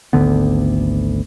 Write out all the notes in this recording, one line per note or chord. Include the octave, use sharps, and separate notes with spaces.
G#1 D2 D3 B3